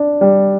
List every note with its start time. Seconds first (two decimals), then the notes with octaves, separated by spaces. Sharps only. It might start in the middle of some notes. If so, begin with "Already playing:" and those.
Already playing: D4
0.21 G3